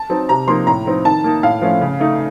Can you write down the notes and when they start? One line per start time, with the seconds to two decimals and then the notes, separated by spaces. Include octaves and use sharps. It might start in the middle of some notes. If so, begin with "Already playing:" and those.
Already playing: A5
0.10 F#3 C4 D#4
0.29 C3 A#5
0.47 F3 A#3 D#4 C6
0.67 A2 A#5
0.86 F3 C4 D#4
1.05 D#3 A5
1.24 A#3 D#4
1.43 A2 F5
1.62 F3 A3 C#4
1.81 C#3
2.00 A3 D#4